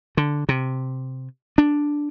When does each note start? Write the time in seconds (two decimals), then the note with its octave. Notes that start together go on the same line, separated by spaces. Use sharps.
0.17 D3
0.49 C3
1.58 D4